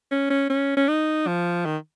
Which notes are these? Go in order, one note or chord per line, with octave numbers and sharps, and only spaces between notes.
C#4
C#4
C#4
C#4
D#4
F3
D#3